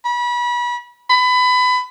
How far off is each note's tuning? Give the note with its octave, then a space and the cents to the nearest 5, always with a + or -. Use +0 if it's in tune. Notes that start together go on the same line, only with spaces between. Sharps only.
B5 -30
B5 +25